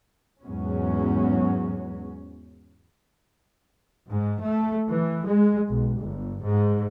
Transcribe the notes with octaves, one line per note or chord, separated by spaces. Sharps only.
E2 G#2 F#3 G#3 B3 C#4
G#2
A3
E3
G#3
B1
G1
G#2